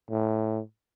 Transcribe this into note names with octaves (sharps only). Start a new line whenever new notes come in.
A2